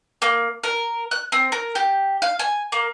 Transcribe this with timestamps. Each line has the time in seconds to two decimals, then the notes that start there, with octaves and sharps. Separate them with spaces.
0.22 A#3
0.63 A#4
1.11 F#6
1.32 C4
1.52 A#4
1.75 G4
2.22 F5
2.39 G#5
2.72 A#3